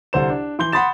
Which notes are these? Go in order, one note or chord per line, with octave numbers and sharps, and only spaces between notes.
C2 D3 C5 E7
D4
E3 C6 G6 G7
F#5 B5 C6 D#6 A6 E7